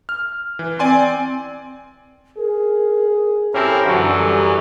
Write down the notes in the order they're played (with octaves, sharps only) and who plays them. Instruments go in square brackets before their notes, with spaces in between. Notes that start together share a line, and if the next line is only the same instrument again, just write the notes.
[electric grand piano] F6
E3
[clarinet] C4 [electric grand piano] D5 G#5 C6
[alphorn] G#4 [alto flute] A#4
[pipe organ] C4 E4 A#4 [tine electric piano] C#4 G4 A4 [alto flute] A#5
[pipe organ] F#2 E3 [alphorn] D3 [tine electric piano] F#4 A4
[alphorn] G3